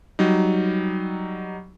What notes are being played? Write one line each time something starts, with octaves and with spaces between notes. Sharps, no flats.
F#3 G3 D#4